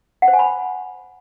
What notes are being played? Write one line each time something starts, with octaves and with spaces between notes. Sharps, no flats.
F#5
C5
G#5
B5